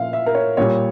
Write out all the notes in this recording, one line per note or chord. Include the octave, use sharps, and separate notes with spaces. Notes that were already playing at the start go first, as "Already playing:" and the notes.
Already playing: A#2 F3 E5 F5
E5
A#4
C#5
A#2 G3 C#5